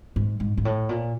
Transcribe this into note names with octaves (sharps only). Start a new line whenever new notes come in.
G#2
G#2
G#2
A2
A#2